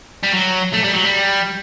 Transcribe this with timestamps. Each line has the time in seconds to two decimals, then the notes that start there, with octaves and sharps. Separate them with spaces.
0.23 G3
0.32 F#3
0.73 A3
0.83 G3
0.93 F#3
1.04 G3